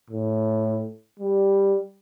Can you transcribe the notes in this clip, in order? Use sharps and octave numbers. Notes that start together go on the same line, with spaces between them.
A2
G3